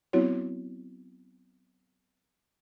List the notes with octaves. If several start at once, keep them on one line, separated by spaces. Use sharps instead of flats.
F#3 B3 C4 E4 F#4 C#5